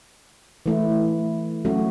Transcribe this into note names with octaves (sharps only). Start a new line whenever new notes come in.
E3 A3 E4
F#3 A3 C#4 F#4